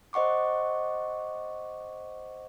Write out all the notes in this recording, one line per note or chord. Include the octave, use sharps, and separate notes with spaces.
C5 D#5 F#5 C#6 D6